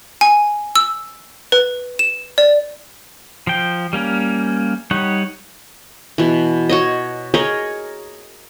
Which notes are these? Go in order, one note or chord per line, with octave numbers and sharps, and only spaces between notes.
G#5
E6
B4
E7
D5
F3 G5
G3 A#3 C#4
G3 D#4 C#5 F#5
B2 E3
F#4 C#5 D#5
G#4 A#4 C#5 D#5